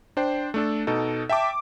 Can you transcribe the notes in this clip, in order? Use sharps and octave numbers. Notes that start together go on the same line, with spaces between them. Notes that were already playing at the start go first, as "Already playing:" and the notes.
D4 C5 G5
A3 D4 A4
B2 D#4 A4
E5 G5 A5 D6